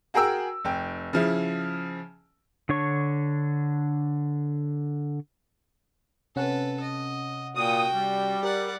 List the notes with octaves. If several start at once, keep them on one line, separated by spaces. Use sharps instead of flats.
F#4 G#4 A#4 G5 E6
F1 G5
C#3 F3 E4
D3 D4 C#5 C#6
C3 C#4 A4 B4 F#5
D#5
A#2 F#4 G5 D#6
G3
G4 A#4 D5 F#5